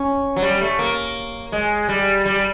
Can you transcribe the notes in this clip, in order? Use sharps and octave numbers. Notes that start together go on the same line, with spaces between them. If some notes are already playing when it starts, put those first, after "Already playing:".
Already playing: C#4
F#3
G3
A3
A#3
G#3
G3
G3